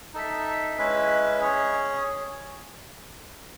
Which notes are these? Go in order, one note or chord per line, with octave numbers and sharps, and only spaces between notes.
D#4 A4 E5
G#3 C#4 E4 B4
C#4 G#4 C#5